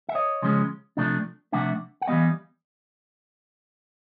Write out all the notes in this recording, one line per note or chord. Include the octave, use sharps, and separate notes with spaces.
E5
C#5 D#5
C#3 F3 G#3 C#4
C3 F3 A3 D4
C3 F3 A3 D4 E5 F#5
F#5
E3 G3 B3 D#5 F5